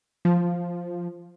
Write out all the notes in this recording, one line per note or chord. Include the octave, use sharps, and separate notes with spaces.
F3